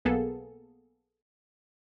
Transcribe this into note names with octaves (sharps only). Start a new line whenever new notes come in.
B1 A#3 B3 G#4 A4